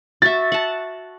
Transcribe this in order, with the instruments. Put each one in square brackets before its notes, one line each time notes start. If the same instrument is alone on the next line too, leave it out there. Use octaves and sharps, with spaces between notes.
[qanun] F#4 E5 [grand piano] A6
[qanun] F#5 A5